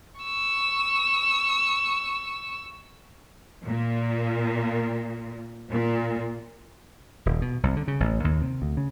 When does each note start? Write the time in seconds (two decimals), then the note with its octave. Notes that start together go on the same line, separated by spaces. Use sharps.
0.21 C#6 E6
3.65 A#2
5.70 A#2
7.26 D#1
7.42 B2
7.63 C2
7.76 D3
7.88 C#3
8.00 A1
8.24 D#2
8.42 C3
8.62 D2
8.77 C#3